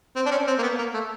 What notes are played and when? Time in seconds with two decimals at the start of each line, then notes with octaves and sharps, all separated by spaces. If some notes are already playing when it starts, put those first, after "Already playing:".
0.16 C4
0.26 D4
0.31 C#4
0.47 C4
0.59 A#3
0.62 B3
0.78 A#3
0.94 A3